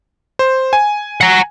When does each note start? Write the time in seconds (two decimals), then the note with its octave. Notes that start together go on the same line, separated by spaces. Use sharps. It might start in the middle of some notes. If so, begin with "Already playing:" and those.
0.39 C5
0.73 G#5
1.21 F#5 A#5